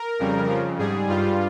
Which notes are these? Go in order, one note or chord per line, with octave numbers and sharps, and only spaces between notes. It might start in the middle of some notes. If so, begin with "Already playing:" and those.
Already playing: A#4
F2 C#3 G3
F2 C#3 F3
G#2 G3 G#4
G2 G3 F4